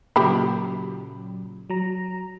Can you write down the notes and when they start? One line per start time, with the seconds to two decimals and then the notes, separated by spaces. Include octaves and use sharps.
0.16 A#2 C#3 F#3 G4 G5 B5
1.70 F#3 A#5